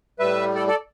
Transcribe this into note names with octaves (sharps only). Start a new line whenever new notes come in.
A2 G3 B4 E5
A4 D5
A4 D5